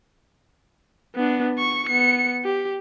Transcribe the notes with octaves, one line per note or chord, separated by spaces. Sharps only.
B3 D4
C#6
B3 C#7
G4